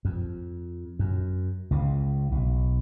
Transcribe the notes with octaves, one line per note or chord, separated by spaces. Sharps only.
F2
F#2
C#2 C#3
B1